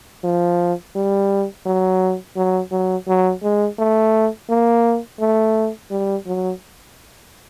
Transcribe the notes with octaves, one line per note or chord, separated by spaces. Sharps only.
F3
G3
F#3
F#3
F#3
F#3
G#3
A3
A#3
A3
G3
F#3